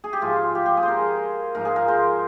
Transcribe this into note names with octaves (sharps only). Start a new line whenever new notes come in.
G#4
G4
G#2 F3 F4
G4
G4
G#4
C5
A#4
G#2 F3 A#4
G#4
A#4
C5